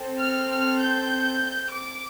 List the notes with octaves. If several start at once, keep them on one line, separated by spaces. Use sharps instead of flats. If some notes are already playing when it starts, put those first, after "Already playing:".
Already playing: C4 A4
F6
F6
G6
D6